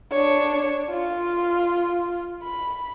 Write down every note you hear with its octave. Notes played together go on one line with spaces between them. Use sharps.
D4 C#5
F4
B5